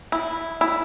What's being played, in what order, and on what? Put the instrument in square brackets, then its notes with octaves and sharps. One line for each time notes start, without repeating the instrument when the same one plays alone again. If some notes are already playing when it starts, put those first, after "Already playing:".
[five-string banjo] E4
E4